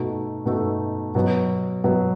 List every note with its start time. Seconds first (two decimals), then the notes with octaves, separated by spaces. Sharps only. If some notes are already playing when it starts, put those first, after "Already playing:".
Already playing: B2 A3 D#4 F#4 A4
0.45 B2 A3 D#4 F#4 A4
1.15 B2 F#3 B3
1.84 B2 F#3 B3